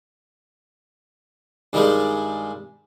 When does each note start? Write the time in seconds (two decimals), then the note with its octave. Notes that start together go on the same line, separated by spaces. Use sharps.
1.73 G2 D#3 G3 G#3